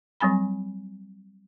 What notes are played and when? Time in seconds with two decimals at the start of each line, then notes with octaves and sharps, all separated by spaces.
0.20 F#3 G3 C4 G#5 B5